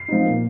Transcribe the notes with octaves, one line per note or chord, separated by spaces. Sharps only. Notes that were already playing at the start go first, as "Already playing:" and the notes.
Already playing: C7
F3 C4 D#4
A#2